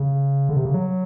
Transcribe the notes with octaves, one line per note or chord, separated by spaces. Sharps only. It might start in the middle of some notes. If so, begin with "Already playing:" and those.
Already playing: C#3
D3
C3
C#3
F#3